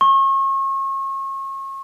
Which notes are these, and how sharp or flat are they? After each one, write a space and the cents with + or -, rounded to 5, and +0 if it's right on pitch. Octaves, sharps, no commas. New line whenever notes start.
C#6 -35